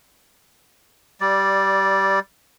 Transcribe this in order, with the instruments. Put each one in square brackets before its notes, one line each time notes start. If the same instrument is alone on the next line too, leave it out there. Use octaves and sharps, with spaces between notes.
[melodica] G3 D5